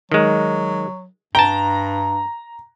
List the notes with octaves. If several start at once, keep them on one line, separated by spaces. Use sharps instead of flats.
D#3 F#3 G#3
G2 G5 A5 A#5